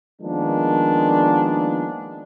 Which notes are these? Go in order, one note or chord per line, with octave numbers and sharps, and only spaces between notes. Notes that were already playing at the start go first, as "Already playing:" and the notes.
D#3 F3 G#3 A#3 B3 D4